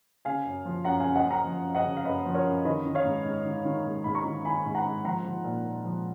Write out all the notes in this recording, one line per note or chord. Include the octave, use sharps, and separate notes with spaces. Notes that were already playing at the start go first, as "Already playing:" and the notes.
C#3 F5 G#5
F#2
F3
F#2 F#5 A#5
F5 G#5
C#3
D#5 F#5
F#2
F#5 A#5
F3
F#2
D#5 F#5
C#3
F5
F#2 B4 D#5
F3
A#4 C#5
F#2
D#3 B4 D#5
D#3
C#5 F5
G#2
G#2
D#3
D#3
G#2
G#2 B5
A#5 C#6
D#3
D#3 G#5 B5
G#2
F#5 A#5
G#2
F3 F#5 A#5
F3
A#2
A#2
F3